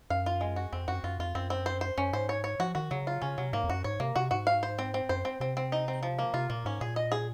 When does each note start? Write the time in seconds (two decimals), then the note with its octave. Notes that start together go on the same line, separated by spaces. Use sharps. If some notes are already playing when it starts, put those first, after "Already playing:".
0.10 F#2 F5
0.26 F4
0.41 G#3
0.56 F#4
0.73 F2 C4
0.88 F#2 F#4
1.04 F#2 F4
1.19 F2 F4
1.35 F#2 C4
1.50 C4
1.66 C5
1.81 C5
1.98 F#2 C#4
2.13 G#2 C5
2.29 C#5
2.44 C#5
2.60 F3 F#4
2.75 D#3 F#4
2.91 C#3 F#3
3.07 F4
3.22 C#3 C#4
3.38 C3 F#3
3.53 G#2 A#3
3.64 F2
3.69 F#2 F#4
3.84 G#2 C#5
4.00 C3 A#3
4.16 C3 F#4
4.31 G#2 F#4
4.47 F5
4.63 C5
4.79 C4
4.94 C4
5.09 F#2 C5
5.25 C4
5.40 C3 C4
5.57 C4
5.72 D#4
5.88 C4
6.03 F3
6.19 A#3
6.34 C3 F4
6.50 A#2 A#3
6.65 G#2 C#4
6.81 A#2 G#4
6.96 D#5
7.12 G#4